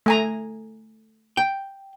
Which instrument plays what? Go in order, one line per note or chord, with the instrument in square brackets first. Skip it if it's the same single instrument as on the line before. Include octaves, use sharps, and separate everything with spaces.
[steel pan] A3 G#5 A#5
[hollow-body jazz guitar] G5